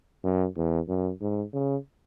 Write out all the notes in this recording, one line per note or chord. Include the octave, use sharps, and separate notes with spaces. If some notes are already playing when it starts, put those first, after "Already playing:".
F#2
E2
F#2
G#2
C#3